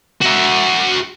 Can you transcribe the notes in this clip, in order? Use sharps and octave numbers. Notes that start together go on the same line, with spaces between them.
F#4 E5